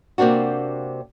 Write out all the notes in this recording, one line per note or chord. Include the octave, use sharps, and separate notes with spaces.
C3 A#3 C4 D4 F#4